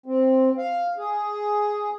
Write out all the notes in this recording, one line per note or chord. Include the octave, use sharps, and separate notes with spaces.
C4
F5
G#4